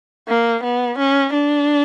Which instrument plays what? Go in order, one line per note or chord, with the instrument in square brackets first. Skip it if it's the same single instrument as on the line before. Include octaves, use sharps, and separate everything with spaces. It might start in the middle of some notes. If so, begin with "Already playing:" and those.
[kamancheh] A#3
B3
C#4
D4